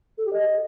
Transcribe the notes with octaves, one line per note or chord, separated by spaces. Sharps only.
A4
G4
D#5